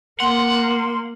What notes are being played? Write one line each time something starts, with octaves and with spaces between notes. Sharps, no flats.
A#3 F#5 C6